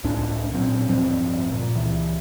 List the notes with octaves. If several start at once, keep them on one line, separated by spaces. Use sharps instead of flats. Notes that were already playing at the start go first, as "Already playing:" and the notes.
C#2 A2 C#4 D4
A#2 F#3 C4
D1 G2 F3 C4
A#2
C#2 E3